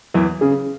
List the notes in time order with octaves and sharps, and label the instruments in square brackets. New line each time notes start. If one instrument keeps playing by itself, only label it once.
[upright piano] E2 E3 [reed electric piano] F#3
[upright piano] C#3 [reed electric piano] C#4 G#4